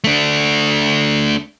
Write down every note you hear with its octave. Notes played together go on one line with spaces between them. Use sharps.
A3 D4